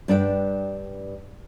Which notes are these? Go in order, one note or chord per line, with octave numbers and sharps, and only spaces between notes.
G2 D4 G#4 G5